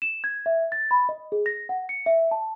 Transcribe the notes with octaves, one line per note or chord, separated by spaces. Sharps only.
E7
G#6
E5
A6
B5
D#5
G#4
A#6
F#5
C#7
E5
A5